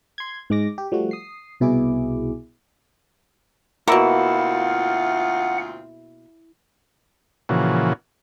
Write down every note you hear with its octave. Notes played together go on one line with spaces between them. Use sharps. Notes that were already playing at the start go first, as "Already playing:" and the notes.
C6 G#6
G#2 G#3 D6 A#6
G4
F3 G3 A3 F#4
D#6 C7
C2 B2 E4 G#4 D6
D2 B2 A#3 C4 E4 F4 F#5
A#2 C#3 E3 F3 F#4